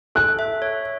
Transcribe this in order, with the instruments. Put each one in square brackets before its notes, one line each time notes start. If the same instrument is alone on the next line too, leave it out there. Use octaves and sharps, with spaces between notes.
[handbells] A4 [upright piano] F#6
[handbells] E5
C#5